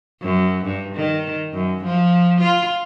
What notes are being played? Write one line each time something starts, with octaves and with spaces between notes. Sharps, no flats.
F#2
G2
D#3
F#2
F3
F4